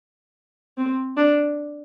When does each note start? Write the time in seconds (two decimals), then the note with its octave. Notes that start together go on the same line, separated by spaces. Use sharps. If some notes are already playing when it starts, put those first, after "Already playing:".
0.78 C4
1.17 D4